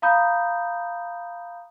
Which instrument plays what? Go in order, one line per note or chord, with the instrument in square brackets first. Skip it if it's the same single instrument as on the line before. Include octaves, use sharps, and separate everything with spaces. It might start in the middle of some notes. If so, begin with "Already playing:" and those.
[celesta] F5 A#5 B5 D#6 G6